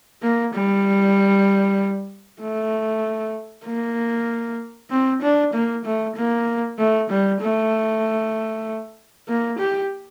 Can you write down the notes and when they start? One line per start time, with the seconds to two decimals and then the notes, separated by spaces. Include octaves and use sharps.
0.22 A#3
0.54 G3
2.41 A3
3.65 A#3
4.90 C4
5.22 D4
5.54 A#3
5.85 A3
6.16 A#3
6.78 A3
7.10 G3
7.41 A3
9.28 A#3
9.59 G4